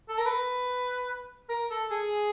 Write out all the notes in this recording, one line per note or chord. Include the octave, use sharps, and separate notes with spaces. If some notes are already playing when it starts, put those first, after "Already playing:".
A4
A#4
B4
A#4
A4
G#4